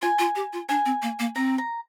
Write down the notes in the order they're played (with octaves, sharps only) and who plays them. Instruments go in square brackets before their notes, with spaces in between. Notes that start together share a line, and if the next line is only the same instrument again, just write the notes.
[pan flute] F4 [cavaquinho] G#5
[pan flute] F4
G4
F4
[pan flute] D4 [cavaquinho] G#5
[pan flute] C4
A#3
A#3
[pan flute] C4 [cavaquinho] A#5
[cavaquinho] A#5